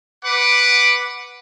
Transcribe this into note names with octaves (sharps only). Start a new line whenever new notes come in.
B4 F#5 D6